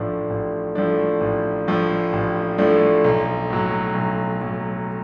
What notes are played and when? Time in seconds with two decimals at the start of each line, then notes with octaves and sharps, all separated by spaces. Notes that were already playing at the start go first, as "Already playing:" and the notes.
Already playing: A1 A2 F3 A3 D4
0.30 A1
0.75 A2 F3 A3 D4
1.21 A1
1.68 A2 F3 A3 D4
2.13 A1
2.58 A2 F3 A3 D4
3.04 B1
3.50 A2 F#3
3.95 B1
4.41 A2 F#3